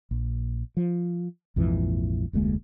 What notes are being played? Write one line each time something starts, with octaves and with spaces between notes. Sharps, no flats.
A#1
F3
A#1 F2 G#2 E3
F1 D2 G#3 A#3